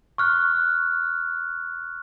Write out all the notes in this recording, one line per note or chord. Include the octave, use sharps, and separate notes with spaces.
C#6 F6 F#6